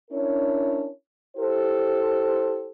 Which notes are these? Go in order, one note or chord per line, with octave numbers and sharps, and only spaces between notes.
C#4 D4 E4 A#4 C#5
E4 G4 A4 C5